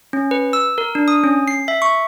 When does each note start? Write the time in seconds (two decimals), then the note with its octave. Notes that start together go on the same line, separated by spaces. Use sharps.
0.13 C#4
0.31 B4
0.53 E6
0.78 A#4
0.95 D4
1.08 D#6
1.24 C#4
1.48 C7
1.68 E5
1.82 C#6